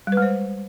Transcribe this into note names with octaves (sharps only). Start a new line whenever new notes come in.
G3
B4
G#3
C5